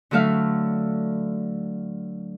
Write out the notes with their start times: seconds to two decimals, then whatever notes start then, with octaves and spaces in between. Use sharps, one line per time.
0.11 D3 F#3 A3 E5 F5